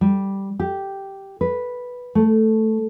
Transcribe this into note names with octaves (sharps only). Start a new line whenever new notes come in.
G3
G4
B4
A3